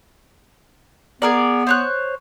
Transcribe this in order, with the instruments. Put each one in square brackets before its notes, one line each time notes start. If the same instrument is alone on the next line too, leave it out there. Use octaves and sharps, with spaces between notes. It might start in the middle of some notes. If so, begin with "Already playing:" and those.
[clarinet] B3 [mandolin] G#4 A#4 D5
[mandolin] C5 C#5 F#6